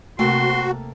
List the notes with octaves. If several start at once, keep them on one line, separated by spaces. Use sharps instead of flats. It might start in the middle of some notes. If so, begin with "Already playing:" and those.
C3 A3 A#3 F#4 G5 C6